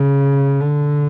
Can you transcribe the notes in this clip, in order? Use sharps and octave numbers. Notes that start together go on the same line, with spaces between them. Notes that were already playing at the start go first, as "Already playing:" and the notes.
Already playing: C#3
D3